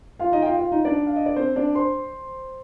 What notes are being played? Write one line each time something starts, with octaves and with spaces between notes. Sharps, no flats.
F4 F5
D#4 D#5
G5
F4 F5
F4 F5
D#4 D#5
D4 D5
F5
D#5
D5
C4 C5
D4 D5
C5 C6